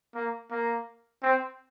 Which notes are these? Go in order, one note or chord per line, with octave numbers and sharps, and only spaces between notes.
A#3
A#3
C4